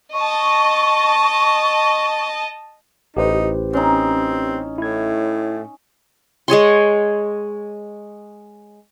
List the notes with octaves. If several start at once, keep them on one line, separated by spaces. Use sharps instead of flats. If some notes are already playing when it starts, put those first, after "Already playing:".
D#5 A5 C#6
A1 D#4 G4 B4 C5
C4 C#4 D#4
A2 E4 G#6
G#3 G#4 C#5 C6